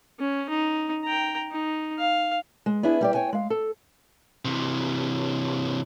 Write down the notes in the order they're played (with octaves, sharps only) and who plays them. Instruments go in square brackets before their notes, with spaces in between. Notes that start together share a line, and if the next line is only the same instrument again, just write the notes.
[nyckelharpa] C#4
D#4
G5 A#5
D#4
F5
[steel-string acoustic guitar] G#3
B3 D4 E4 G#4
G3 G4 D5
C#5 G5 G#5
G#3 F5
A4
[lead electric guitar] C3 E3